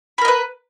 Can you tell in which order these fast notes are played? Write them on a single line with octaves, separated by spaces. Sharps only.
B5 A#4 D#5 B4